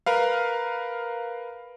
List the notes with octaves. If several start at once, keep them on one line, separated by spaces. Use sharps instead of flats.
A#4 B4 F5